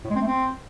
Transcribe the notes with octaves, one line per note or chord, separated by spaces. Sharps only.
A2
G#3
C4
A3
C4